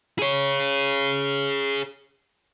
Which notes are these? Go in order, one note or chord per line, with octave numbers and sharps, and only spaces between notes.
G#4 C#5